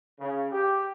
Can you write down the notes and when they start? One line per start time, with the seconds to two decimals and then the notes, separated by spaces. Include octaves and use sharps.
0.20 C#3
0.52 G4